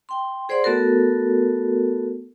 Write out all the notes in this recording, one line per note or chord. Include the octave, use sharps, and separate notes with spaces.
G5 C6
G#4 C5 D5 F#5 C6
A3 B3 F#4 A4 A#4